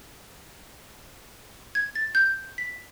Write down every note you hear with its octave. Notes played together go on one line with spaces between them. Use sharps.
G#6
A6
G6
B6